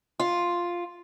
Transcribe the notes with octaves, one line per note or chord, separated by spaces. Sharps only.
F4